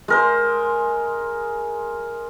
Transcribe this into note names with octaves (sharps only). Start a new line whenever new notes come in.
G#3 A#4 C5